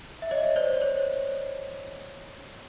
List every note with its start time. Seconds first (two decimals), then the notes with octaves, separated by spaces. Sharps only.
0.22 E5
0.31 C#5 D#5
0.56 C5 D5
0.82 C#5